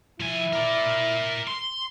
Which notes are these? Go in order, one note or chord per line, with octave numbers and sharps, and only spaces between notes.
F3 E4 G#5
A#4 D5
C6